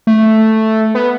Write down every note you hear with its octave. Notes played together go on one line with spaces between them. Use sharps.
A3
B3